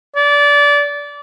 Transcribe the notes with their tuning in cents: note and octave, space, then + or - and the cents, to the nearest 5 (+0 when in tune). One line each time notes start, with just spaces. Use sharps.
D5 -25